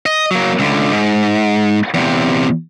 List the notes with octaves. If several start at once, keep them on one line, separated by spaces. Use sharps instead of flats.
D#5
F#3 A#3
C#2 D3
G#2
E2 C3